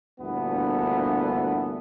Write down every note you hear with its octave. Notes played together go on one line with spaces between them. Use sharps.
D2 G2 A#2 E3 B3 A4